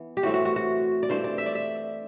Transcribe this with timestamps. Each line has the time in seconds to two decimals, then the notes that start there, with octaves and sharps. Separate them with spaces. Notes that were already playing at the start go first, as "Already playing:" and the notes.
Already playing: E3 B3
0.17 G4
0.23 A2 E3 A3 C4 F#4
0.34 F#4
0.45 F#4
0.56 F#4
1.03 D5
1.09 G2 E3 A3 D4 C5
1.24 D5
1.38 E5
1.46 D5
1.55 E5